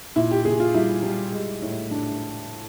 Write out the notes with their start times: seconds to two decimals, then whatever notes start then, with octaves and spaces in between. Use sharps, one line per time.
0.16 A#2 E4
0.31 G4
0.45 A#2 G#4
0.60 F4
0.74 G3 E4
1.03 G3
1.32 G#3
1.62 A2
1.91 A2 D4